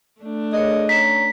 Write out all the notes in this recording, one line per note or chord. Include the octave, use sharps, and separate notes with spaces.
A3 D4
G#4 A#4 C#5 D#5
C#4 C#5 A#5 B6